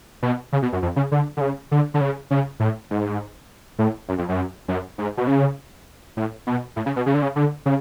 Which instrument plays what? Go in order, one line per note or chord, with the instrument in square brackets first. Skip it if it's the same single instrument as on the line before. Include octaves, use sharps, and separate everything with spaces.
[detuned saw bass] B2
C#3
B2
F#2
F2
C#3
D3
D3
C#3
D3
D3
C#3
C#3
A2
G#2
A2
F#2
F2
F#2
F#2
G#2
B2
C#3
A2
B2
A2
C#3
B2
C#3
D3
C#3
D3
C#3